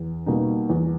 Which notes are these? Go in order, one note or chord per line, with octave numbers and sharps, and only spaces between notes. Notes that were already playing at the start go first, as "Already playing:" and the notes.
Already playing: E2
B2 G3 A#3 D#4
E2